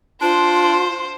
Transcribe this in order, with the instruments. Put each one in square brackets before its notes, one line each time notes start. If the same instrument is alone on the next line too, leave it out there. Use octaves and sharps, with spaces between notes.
[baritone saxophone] D4 [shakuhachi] F4 [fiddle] C5